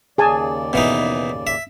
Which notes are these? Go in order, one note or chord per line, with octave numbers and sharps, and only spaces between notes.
D#2 C#3 G#4 D5 G#5 A5
B2 E3 D#4
E5